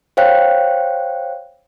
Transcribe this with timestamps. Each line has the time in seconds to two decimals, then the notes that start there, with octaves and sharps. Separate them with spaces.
0.17 C5 C#5 F5 G5 F#6